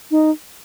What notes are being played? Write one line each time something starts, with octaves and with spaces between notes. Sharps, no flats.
D#4